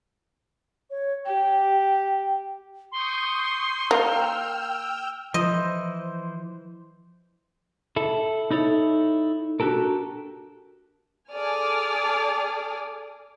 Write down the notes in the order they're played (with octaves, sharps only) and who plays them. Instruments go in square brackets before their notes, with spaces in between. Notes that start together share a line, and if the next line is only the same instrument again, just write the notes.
[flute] C#5
[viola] G4 [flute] G5
[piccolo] C6 [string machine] C#6 D#6 G6
[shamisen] A#3 [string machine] G5 E6 F6
[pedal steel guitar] E3 C5 [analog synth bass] F3 [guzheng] D#5
[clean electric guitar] E4 A4
D#4 E4 A4 C#5
D4 F#4 G4 A4 A#4
[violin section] G#4 A4 D5 G#5 D#6 F6